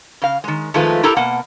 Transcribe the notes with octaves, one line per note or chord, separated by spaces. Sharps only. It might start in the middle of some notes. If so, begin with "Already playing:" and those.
C#3 F5
D#3 G#3
D#3 F3 G#3 A3 F4 B4
E4 G4 A4 A#4 A#5
B2 A#3 F#5